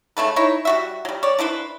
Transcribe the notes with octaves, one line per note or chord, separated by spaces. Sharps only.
C#3 A3 A4 B4
D#4 E4 C#5
G3 F#4 E5
F#3 G3
C#5 D5
D4 E4 B4 C5